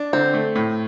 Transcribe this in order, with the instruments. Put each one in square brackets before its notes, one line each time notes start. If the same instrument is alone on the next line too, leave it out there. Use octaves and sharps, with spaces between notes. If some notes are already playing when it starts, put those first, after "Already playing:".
Already playing: [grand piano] D4
[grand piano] D3 [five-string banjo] C4
[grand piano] A3
A2